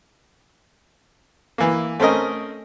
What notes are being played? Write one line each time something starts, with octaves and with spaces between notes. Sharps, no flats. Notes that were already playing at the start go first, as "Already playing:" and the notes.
E3 A#3
A3 C4 C#4 A#4 D#5